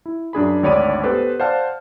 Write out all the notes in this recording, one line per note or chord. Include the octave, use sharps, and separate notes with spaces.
E4
F#2 D4 G#4 B5
G#1 D2 C#5 D5 B5 D#7
B3 G4 A4 B4 C5
C5 D5 F5 F#5 A5 F6